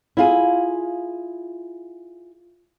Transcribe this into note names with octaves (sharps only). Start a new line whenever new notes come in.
E4 F4 G#4